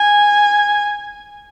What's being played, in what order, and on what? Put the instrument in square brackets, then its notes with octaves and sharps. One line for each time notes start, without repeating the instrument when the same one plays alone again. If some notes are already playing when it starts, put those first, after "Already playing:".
Already playing: [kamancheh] G#5